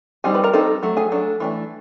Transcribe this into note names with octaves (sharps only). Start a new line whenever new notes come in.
G3 C4 D#4 G#4 G#5
B4 B5
A#4 A#5
G3 C4 D#4 A4 A5
F#3 A3
G#4 G#5
F#3 A3 D4
E3 A3 D4